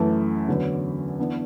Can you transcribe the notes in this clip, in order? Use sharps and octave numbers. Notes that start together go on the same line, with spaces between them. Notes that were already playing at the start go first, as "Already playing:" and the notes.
Already playing: F#2 E3 A3
E2 D3 F#3
E3 B3 D4